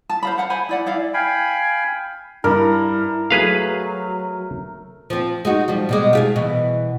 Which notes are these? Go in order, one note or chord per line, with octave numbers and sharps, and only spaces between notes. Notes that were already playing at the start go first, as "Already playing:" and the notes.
A5
C5 F5 B5
C5 F5 F#5
C5 G#5 B5
E4 D5 F#5
E4 D5 F5
F5 G5 G#5 B5
G2 E4 A#4
F#3 A3 G#4 B4 F5
F3 C4
G#3 D#4 F#4
F3 G3
B2 G3 G#3
F4 G4 G#4
B2 E3